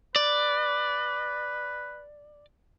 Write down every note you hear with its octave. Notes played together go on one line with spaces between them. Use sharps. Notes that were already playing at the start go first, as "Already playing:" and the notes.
B4 D5